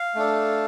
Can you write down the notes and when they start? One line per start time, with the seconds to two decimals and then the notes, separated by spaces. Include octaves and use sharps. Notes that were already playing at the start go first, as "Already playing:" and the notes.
Already playing: F5
0.15 A3 D4 A4